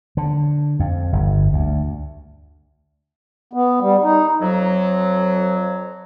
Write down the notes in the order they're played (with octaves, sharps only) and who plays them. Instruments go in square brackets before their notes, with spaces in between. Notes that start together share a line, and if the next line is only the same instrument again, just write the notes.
[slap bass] D3
F2
G1
D2
[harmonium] B3
G3
D#4
[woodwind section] F2 F#3